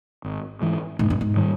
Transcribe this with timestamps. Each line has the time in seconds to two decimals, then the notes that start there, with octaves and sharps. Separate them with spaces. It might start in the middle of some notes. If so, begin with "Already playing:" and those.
0.24 G#1
0.62 G#2 E3
0.99 E1 G#2
1.10 G2
1.21 G#2
1.36 D#3 G3